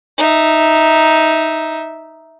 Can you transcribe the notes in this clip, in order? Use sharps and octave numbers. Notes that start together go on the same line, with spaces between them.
D#4 E5